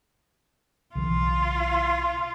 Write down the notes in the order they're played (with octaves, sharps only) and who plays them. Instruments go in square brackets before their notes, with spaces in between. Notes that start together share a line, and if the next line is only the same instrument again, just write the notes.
[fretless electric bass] B1 C#3 E3 [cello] F4